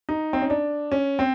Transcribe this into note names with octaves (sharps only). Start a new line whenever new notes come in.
D#4
C4
C#4
D4
C#4
C4